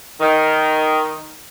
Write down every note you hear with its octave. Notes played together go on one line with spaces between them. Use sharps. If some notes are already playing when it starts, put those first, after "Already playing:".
D#3